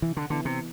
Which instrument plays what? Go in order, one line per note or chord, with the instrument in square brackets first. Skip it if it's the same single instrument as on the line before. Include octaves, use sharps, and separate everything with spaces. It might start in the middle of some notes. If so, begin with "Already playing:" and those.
[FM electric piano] C3 [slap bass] E3
[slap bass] D3
[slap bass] D3 [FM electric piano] E3 B3 E4
[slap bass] C3